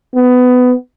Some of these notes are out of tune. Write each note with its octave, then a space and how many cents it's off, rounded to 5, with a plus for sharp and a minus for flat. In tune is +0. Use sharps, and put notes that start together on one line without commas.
B3 +20